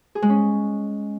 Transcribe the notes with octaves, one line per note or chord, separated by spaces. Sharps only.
G#4
G#3
C#4